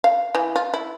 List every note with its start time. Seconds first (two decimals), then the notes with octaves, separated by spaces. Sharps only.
0.04 F5
0.35 E3
0.56 F4
0.74 E4